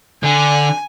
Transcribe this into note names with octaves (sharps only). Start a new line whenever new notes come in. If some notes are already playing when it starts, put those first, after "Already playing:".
D3 G#5